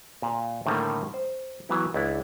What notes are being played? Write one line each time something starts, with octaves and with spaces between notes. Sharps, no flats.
A#2 F5
A2 D3 D#3 G3 A3 A#3
C5
E3 F#3 B3 E4
C#2 D4 E4